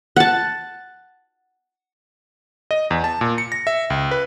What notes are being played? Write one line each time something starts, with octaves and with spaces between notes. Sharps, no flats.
F#5 A5
D#5
E2
A5
A#2
C#7
A#6
E5
C#2
B4